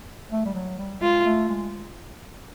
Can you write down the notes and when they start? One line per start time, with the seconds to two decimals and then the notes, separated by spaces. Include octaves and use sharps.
0.32 A3
0.45 G3
0.54 F#3
0.78 G3
1.01 G#3 F4
1.25 A3
1.49 G#3